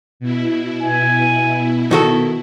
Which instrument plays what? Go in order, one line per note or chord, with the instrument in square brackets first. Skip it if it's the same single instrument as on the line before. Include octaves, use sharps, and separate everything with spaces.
[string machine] B2 E4
[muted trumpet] G#5
[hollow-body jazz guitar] D#3 F#4 A4